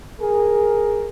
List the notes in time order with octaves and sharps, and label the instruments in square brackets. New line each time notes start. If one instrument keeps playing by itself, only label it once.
[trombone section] G#4 A#4